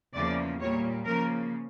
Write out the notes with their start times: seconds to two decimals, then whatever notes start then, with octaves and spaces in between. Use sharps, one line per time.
0.13 E2 C#3 F3 A#3 D5
0.59 A#2 G3 A#3 C#5
1.05 C#3 F3 A#3 A#4